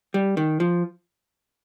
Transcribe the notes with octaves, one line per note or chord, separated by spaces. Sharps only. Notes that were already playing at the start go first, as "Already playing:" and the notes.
G3
D#3
F3